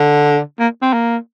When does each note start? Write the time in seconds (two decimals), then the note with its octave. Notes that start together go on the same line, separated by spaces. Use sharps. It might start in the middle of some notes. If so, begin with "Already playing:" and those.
Already playing: D3
0.59 A#3
0.82 C4
0.93 A#3